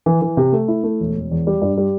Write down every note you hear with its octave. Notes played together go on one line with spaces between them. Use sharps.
E3
E3
C3
A3
E4
A3
E1
E1
E2
G3
G2
G3